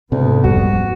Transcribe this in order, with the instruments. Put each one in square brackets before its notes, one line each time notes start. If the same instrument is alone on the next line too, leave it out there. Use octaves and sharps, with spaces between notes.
[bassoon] D2 [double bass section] G#2 B3 [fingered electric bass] C3
[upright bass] D#1 F2 [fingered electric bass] G3 [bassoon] F#4